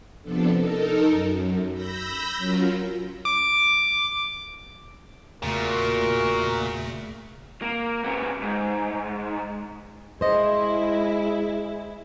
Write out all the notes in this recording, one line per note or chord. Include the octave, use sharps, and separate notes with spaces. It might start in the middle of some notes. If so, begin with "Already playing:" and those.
C3 F3 B3 D4 A4
D#4 A4 A#4
F#2
B5 E6 G6 A#6
F#3 C#4 F4 A#4
D6
E2 A#2 C#3 A3 F#4 A#4
A#3
C#3 B3
G#2
G#3 E4 C5 D#5